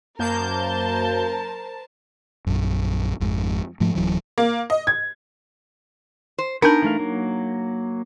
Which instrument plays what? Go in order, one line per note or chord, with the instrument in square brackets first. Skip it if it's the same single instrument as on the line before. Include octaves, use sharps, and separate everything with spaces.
[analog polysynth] F#2 A#3 G6 [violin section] A#4 C5 A5
[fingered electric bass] A#1 F#2
G#1 F2 G#2
G#2 F3 A3
D1 A#1 E3 F#3
[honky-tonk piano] A#3
D#5
G#6
[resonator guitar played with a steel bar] C5
[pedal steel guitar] B3 G#5 G6 [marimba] D4 D#4 A5 [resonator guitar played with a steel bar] A#4
[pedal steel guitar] E3 A3 F5
F#3 A#3